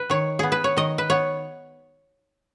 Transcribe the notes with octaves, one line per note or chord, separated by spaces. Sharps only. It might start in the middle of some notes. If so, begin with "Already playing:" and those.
Already playing: B4
D#3 C#5
B3 G#4
B4
C#5
D#3 D#5
B4
B3 C#5